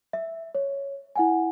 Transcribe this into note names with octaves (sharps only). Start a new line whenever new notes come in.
E5
C#5
E4 F#5 G#5